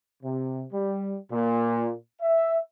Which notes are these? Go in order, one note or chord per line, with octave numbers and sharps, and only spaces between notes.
C3
G3
A#2
E5